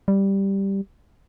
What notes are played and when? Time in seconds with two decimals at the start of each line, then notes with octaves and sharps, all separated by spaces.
0.08 G3